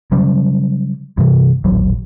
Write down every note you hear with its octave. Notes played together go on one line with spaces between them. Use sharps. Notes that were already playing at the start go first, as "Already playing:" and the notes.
C#3 F#3 G3 C#4
G2 C3 E3
D#1 A1 F#3